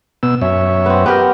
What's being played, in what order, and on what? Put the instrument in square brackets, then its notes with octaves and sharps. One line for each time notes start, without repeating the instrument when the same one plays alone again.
[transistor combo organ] B2 B3 E6
F#2 C#5 E5
[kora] B3 C4
[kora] B3 G4 A#4 [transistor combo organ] G5